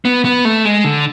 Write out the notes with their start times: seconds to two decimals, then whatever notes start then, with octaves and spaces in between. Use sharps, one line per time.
0.05 B3
0.25 B3
0.45 A3
0.65 G#3
0.84 D3